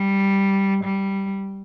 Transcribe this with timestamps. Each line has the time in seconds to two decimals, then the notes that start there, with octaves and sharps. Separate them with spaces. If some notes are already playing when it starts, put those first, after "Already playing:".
Already playing: G3
0.84 G3